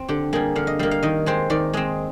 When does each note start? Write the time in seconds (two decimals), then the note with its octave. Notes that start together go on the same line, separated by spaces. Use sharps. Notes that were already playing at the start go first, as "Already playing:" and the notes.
Already playing: C4
0.08 D3 G4
0.33 G3 A#3 G#4
0.56 D3 F5
0.67 D#5
0.79 G3 A#3 F5
0.91 F5
1.03 D#3 D#5
1.26 G#3 C4 C5
1.50 D#3 D5
1.73 G#3 C4 D#5